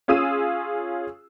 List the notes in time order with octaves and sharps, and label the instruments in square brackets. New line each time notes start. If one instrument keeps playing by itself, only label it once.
[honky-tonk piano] C#4 F4 G#4 D#6 E6 D#7